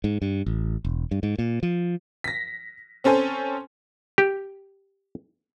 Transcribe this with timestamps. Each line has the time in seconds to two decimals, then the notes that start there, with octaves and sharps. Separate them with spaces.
0.04 G#2
0.22 G2
0.46 A1
0.85 E1
1.11 G2
1.23 G#2
1.39 A#2
1.63 F3
2.24 A#6 B6
3.04 C4 C#4 A4 C5 G#5
4.18 G4